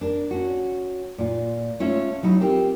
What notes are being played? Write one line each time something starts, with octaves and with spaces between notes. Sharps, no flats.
D4 A#4
C#4 F#4
A#2 F4
G#3 A3 C#4 F4 C#5 E5
F#3 D#4 E4
C4 F4 G4 A#4 C5